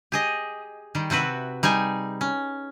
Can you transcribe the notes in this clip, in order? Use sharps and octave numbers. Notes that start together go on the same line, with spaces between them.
G4 G#4 D#5
D#3 G3
C3 C4 F#4 B4 E5
G3 D#4 G#4 G#5
C#4